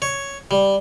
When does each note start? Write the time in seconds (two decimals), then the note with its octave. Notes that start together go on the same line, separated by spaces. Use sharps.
0.02 C#5
0.51 G3